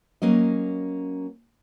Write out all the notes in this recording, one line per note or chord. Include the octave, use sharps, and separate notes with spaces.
F#3 A#3 C#4 D#5